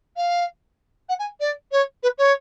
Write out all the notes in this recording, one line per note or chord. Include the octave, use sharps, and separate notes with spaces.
F5
F#5
G#5
D5
C#5
B4
C#5